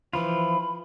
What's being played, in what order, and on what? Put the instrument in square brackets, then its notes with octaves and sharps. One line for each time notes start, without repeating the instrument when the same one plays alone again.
[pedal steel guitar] E3 F3 F4 [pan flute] B5